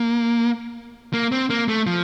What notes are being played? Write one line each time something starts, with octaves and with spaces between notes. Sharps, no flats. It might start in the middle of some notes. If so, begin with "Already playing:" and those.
Already playing: A#3
A#3
C4
A#3
A3
F3